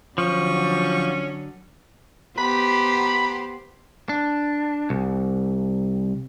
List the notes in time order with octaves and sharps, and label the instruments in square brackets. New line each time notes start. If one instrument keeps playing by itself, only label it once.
[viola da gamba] D3 F#3 [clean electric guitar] F3 [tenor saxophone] C#4 [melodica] C#6
[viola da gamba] B3 G4 C5 [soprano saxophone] B5
[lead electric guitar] D4
C2